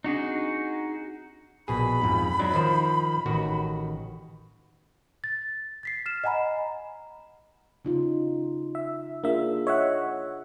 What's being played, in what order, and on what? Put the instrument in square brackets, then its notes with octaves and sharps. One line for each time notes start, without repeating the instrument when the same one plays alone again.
[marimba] C4 D4 [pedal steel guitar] D#4 F#4 G#4
[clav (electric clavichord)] A#1 B2 G#4 [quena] B5
[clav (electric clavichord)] F2 G#2
F#3 D4 D#4
D#3 F3 C5
A1 D#3 F#4
[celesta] A6
A6 B6 C7
F6 E7
D#5 F#5 G#5 A#5 B5
[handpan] C#3 D#4 F4
[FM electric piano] E5
[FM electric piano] A#3 E5 [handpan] D4 F4 G#4
[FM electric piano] C#5 E5 F#5 [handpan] D#5